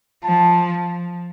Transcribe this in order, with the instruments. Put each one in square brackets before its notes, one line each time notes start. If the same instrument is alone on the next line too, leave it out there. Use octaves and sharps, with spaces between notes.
[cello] F3 [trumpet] A5